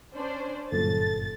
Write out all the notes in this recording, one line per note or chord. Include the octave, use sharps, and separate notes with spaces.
C#4 D4 C5
G1 F#2 A#2 A4 A6